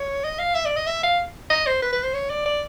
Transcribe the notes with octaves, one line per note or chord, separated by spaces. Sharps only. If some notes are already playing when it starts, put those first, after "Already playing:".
Already playing: C#5
D#5
F5
E5
D5
D#5
E5
F5
D#5
C5
B4
B4
C5
C#5
D5
D5